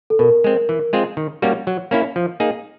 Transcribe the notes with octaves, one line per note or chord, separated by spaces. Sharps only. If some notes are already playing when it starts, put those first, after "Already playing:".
A4
B2 A#4
G#3 C4
E3
G#3 C4 F4 G#4
D#3
G3 A#3 C#4 F#4
F#3
A#3 C#4 E4
F3
A#3 D#4 G#4